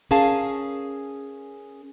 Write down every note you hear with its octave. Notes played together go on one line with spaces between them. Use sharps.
C#4 G#4 A#4 F5 A5